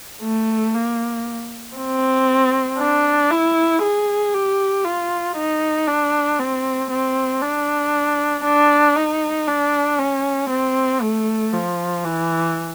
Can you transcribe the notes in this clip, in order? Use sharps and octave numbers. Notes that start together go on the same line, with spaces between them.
A3
A#3
C4
D4
E4
G#4
G4
F4
D#4
D4
C4
C4
D4
D4
D#4
D4
C#4
C4
A3
F3
E3